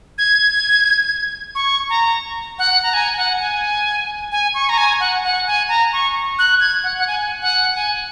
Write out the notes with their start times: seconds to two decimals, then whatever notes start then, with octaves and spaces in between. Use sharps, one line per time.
0.18 G#6
1.55 C#6
1.89 A#5
2.59 F#5
2.83 A#5
2.93 G#5
3.17 F#5
3.40 G#5
4.32 G#5
4.54 C#6
4.69 A#5
4.78 G#5
5.00 F#5
5.23 F#5
5.47 G#5
5.69 A#5
5.93 C#6
6.39 F#6
6.60 G#6
6.84 F#5
6.98 F#5
7.08 G#5
7.41 F#5
7.75 G#5